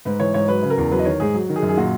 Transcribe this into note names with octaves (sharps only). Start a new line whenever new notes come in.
G#2 B4
E3 C#5
G#2 C#5
F#3 B4
C#3
A#4
E2
F#3 B4
D#5
D#3 C#5
G#2 G#4
F#3
D#3
G#4
F#2
G#4
A#2 F#4